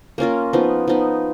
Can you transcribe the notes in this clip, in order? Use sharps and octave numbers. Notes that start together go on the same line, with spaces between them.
A#3 C#4 F4 A#4
F3 B3 D#4
F3 B3 D#4